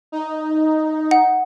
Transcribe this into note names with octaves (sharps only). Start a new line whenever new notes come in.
D#4
F#5